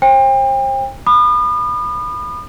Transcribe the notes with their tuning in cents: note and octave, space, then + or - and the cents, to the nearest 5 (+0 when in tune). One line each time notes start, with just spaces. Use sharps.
C5 +35 G5 +35
B5 +0 D#6 -40